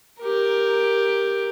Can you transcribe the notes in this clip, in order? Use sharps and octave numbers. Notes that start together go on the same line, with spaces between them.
G4 A#4